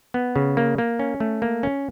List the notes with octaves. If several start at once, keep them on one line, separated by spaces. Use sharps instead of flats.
B3
C#3
A#3
A#3
C#4
A3
A#3
C#4